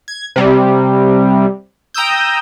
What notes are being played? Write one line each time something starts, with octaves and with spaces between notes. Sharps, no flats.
G#6
C3 G3
G5 A#5 D#6 E6 G6